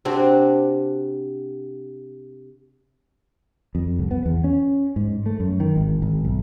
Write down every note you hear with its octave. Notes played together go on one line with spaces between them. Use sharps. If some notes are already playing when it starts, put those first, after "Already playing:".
C3 C4 D4 F#4
F2
C2
B3
E2
C#4
G#2
A3
F#2
D#3
G#1
G#1
B1